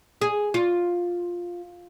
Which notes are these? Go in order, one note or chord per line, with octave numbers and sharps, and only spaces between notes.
G#4
F4